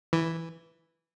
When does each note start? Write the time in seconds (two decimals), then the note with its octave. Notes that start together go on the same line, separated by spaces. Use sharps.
0.13 E3